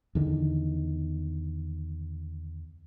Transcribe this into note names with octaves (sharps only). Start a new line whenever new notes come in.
E2 D3 D#3